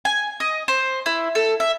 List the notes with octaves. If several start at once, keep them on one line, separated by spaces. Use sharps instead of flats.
G#5
D#5
C5
E4
A4
E5